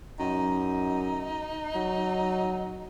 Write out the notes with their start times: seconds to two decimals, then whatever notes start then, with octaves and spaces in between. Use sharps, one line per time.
0.19 F#2 D#4
1.75 F#3